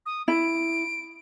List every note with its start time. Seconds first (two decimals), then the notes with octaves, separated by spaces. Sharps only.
0.06 D#6
0.28 E4 D7